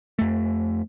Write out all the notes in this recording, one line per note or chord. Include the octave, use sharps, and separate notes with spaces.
F2 A3